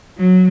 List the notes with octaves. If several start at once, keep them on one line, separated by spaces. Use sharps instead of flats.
F#3